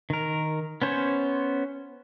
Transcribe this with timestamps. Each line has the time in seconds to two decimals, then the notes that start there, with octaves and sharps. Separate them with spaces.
0.10 D#3 A#4
0.82 B3 C#4 C5 C#5